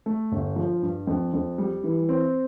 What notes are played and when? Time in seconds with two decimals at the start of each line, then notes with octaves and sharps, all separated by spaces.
0.06 A3
0.32 G1
0.56 F3
0.82 G2
1.07 F2
1.33 F2
1.58 G3
1.84 E3
2.09 C4